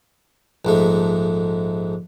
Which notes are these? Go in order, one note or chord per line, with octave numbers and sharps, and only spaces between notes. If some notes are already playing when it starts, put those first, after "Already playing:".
A#1 G#2 A3